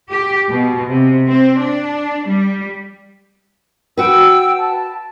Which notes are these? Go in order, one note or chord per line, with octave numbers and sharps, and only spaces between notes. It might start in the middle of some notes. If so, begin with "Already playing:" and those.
G4
B2
C3
C4
D4
G3
F#4 B4 G5 E6
A5